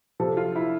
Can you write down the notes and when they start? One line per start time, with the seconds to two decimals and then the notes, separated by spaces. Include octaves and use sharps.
0.20 C3 F3 A4
0.37 F4
0.56 E4